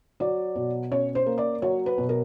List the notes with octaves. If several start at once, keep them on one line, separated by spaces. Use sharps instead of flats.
F#3 D5
B2
C#4 C#5
C5
A#3
D5
F#3 C#5
B4
B2
A#4